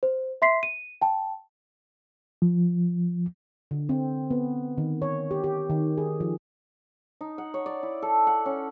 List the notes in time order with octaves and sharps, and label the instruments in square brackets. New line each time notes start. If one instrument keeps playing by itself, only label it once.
[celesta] C5
E5 C6 B6 C7
D#7
G5 A5
[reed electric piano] F3
[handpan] D3
C4
B3
D#3
C#5
G4
G4
D#3
G#4
F3
[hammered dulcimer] D#4
F#5
C#5
D5
E4
A4
F#5
C#4